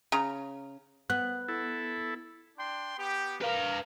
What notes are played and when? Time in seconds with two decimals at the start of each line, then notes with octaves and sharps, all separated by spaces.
0.12 C#3 A#5
1.10 B3 F#6
1.48 E4 A4
2.58 D4 G5 C6
2.98 B3 G4
3.41 A#4 B4 F5